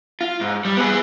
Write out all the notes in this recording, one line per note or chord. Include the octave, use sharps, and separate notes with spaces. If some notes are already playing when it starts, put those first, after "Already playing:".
F4
G#2
G3
B3 G#4